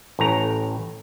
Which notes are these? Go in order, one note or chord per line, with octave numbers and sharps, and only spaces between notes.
A1 A2 A#5